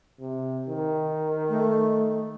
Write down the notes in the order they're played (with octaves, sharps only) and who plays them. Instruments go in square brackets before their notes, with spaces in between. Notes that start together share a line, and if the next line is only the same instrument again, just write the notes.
[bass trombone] C3
D#3
[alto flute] A3